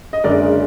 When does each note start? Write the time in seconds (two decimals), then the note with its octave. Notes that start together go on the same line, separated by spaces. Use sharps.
0.13 D#5
0.24 F#1 F#2 D3 G#3 A#4 D5